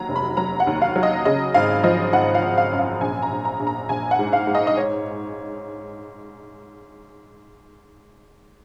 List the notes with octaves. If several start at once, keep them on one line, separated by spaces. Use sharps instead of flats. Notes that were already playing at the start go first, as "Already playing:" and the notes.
Already playing: D#2 F#3 A#5
F1
B5
F#3 A#5
F#5
D#2
F5
F#3
D#5
C#3 D#5
G#1 F5
F3 D#5
G#1 F#5
F5
G#1
F5
F#2
F5
A#1 G#5
A#5
A#1
A#5
A#1
A#5
A#1 G#5
F#5
G#2
F5
G#2
D#5
D#5
C#5